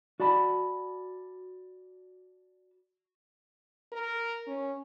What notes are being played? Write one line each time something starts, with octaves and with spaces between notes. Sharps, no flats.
F#4 D5 A5 B5
A#4
C#4